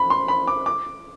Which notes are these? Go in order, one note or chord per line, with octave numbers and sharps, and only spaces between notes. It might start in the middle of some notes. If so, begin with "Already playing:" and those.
Already playing: B5
C6
B5
D6
D6